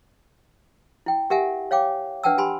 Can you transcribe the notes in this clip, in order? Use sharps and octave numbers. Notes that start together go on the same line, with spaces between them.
E4 G5
G4 A#4 E5 F#5 G#5
C#5 F5 G5 D6
D4 B4 F#5 G5 A5 E6
G4 G#5 B5 C6